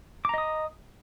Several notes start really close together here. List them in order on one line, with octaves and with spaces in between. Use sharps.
D6 A#5 D#5 D#6